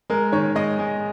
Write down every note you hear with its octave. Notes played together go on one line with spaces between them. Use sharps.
G#3 A#4
D#3 C#5
G#3 D#5
G#3